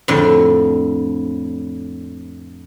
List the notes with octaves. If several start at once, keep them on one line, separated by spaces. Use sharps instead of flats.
F2 A2 D3